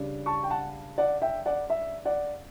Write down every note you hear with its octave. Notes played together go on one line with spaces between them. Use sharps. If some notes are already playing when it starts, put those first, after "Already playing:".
Already playing: C#3 G3 D4
A5 C#6
G5
F#5 A5
D5 F#5
E5 G5
D5 F#5
E5
D5 F#5